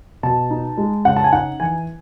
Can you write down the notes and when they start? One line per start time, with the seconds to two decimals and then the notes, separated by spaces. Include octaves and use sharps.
0.23 B2 A5
0.50 D#4
0.78 G#3
1.05 C#3 F#5
1.16 A5
1.24 G#5
1.32 D#4 F#5
1.60 E3 G#5